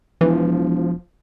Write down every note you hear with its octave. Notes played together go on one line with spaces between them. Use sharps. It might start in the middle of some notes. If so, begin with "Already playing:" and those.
E1 E3 F3